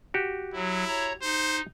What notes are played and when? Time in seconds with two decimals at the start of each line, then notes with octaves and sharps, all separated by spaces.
0.14 F#4 G4
0.54 F#3 E4
0.88 C#5 A#5
1.23 D#4 C5